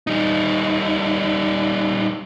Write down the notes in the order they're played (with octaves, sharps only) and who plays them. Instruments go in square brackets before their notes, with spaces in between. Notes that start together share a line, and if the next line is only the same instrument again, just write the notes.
[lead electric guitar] G3 D#4